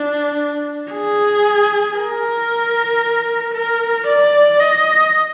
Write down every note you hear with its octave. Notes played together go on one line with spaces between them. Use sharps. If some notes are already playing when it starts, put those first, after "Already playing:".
Already playing: D4
G#4
A#4
A#4
D5
D#5